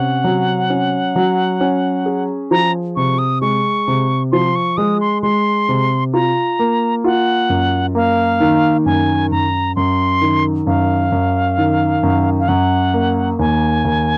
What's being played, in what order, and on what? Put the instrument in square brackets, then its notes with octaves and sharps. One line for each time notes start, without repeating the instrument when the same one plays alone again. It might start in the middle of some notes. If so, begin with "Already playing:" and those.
Already playing: [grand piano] C3 C#4 [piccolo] F#5
[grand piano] F#3
C#4
F#3
C#4
G#4
[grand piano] F3 [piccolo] A#5
[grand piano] C3 [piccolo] C#6
[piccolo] D#6
[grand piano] G#3 [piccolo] C#6
[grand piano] C3
[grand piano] F3 [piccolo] C6
[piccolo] C#6
[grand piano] G#3 [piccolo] D#6
[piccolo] C6
[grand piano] G#3 [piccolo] C6
[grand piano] C3
[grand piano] F4 [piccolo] A#5
[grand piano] A#3
[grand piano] F4 [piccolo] F#5
[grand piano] F#2
[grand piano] A#3 [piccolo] F5
[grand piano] D#3
[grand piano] F#2 [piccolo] G#5
[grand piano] F#2 [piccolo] A#5
[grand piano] F#2 [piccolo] C6
[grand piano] D#3
[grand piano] F#2 [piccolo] F5
[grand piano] F#2
D#3
F#2
[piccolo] F5
[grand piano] F#2 [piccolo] F#5
[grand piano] A#3
[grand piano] D#2 [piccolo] G#5
[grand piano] D#2